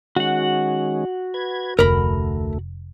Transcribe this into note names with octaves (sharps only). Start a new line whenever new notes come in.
D#3 G#3 C#4 F#4 F#5
B4 G#6
F1 D2 A3 A#4 B5